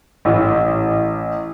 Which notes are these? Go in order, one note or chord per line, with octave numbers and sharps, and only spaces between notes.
A1